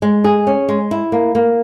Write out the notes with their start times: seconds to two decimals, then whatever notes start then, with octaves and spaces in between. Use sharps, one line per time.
0.02 G#3
0.24 G#4
0.47 C#4
0.69 G#3
0.91 E4
1.12 A#3
1.35 A#3